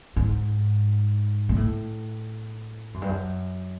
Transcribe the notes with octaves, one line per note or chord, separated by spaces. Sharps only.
G#2
A#2
A2
F#2
G2
F#2